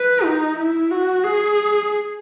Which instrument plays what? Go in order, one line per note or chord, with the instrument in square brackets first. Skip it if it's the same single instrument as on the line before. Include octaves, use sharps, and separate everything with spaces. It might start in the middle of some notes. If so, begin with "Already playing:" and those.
Already playing: [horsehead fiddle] B4
D#4
E4
F#4
G#4